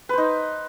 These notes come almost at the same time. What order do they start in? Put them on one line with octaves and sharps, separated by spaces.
B4 C5 D#4